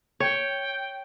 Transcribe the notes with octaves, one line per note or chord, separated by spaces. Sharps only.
C#5 G5